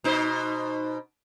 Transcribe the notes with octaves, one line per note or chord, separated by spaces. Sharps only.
B2 D#4 C5